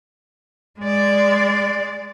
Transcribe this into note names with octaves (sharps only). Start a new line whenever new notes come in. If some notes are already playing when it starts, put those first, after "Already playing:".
G#3 D5